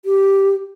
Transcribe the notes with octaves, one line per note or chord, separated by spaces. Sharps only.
G4